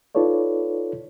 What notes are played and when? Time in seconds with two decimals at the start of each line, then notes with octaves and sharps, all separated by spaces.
0.15 D#4 F4 A4 B4 C#5 D5